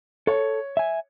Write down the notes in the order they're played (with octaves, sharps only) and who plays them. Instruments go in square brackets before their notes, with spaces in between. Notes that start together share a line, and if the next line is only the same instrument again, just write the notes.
[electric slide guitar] A4 [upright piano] C#5
[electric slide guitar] E5 G#5